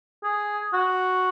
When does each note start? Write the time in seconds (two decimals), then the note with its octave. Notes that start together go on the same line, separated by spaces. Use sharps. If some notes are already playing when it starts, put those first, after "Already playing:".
0.24 G#4
0.73 F#4